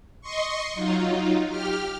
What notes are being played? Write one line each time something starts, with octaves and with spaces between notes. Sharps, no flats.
D#5 C6 C#6
F#3 D#4 F4
G4 F6